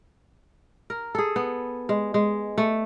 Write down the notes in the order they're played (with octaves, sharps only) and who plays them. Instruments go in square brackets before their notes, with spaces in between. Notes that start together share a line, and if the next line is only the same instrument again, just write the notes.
[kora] A#4
G#4 A4
B3
G#3
G#3
A3